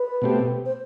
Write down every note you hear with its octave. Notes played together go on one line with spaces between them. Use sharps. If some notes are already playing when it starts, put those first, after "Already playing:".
Already playing: B4
B2 A3 C4 G4
C5